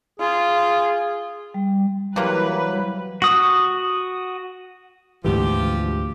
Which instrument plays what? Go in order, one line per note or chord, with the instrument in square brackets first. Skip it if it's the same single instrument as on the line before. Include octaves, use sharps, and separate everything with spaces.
[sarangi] F4 [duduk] G#4
[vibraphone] G3
[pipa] C3 A#3 [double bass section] E3 G3 [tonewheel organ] F#3 [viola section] B4
[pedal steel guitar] F#4 D#6
[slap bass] D2 G#2 E3 [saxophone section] F3 G4